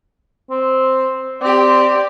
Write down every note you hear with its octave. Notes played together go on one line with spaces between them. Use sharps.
C4
C4 G4 D5